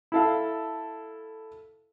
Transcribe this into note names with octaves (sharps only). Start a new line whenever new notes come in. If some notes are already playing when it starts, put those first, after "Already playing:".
E4 A4 F5